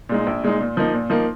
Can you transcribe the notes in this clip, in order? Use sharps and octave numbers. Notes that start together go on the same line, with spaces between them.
A#2 G#3 D#4
A#1
A#2 G#3 D#4
A#2
F3 A#3 D#4
A#2
F3 A#3 D#4